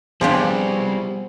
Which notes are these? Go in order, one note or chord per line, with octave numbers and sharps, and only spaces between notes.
F3 G3 B3 C4 D4 G4 G#4 C5